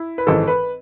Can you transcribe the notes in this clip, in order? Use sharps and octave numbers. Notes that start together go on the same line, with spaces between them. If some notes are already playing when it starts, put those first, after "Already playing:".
Already playing: E4
B4
G#1 G#2 E3 A4
B4